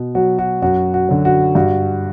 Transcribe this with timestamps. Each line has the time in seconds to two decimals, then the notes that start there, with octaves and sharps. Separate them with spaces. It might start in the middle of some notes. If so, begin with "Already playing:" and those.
Already playing: B2
0.15 F#3 F#4
0.39 F#4
0.62 F#2 F#4
0.94 F#4
1.09 D3 F#3
1.25 F#4
1.55 G2 F#4